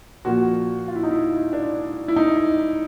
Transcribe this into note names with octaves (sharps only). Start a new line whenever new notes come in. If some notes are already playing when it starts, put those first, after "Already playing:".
A#2 F3 F#4
F4
E4
D#4
E4
D4
E4
D#4